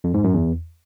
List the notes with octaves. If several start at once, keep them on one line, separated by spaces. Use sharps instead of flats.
F2
G#2
F#2
E2